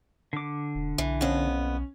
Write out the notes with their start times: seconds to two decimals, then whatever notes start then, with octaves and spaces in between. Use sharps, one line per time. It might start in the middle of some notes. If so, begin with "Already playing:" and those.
0.33 D3 D6
0.75 E1
0.98 B1 E3
1.21 F2 B3 C#4